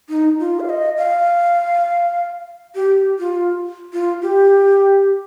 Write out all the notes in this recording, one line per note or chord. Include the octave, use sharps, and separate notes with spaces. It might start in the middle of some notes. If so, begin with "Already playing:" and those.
D#4
F4
F5
D#5
F5
G4
F4
F4
G4